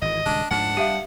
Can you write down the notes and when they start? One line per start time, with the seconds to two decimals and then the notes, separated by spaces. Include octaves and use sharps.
0.02 G#1 E3 D#5
0.26 D#1 C#3 G#3 D4
0.51 D2 G#2 F3 D4 F#5
0.77 G3 G4 E5 F5